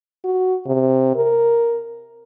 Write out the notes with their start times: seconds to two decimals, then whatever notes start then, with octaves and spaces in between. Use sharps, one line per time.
0.24 F#4
0.66 C3
1.16 A#4